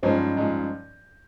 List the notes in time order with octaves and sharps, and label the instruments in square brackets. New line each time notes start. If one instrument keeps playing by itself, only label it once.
[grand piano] G2 F3 G#3 D#4 [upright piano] C#4
[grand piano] G2 F3 G#3 D#4